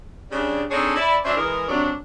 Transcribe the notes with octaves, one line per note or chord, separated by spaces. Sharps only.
C#3 G3 D4
C4 D4 D#4 G#4 A4 C#5
E4 D5
F#3 C#4 D4 C5 E5
E3 G#3 A#4
C3 F#3 D4